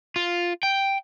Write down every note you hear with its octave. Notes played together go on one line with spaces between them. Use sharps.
F4
G5